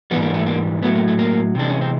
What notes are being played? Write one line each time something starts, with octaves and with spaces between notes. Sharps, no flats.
G#2 E3 G3 B3
A#3
A3
A#3
A2 F#3 A3 B3
A#3
A3
A#3
C3 E3 G#3 D4
C#4
C4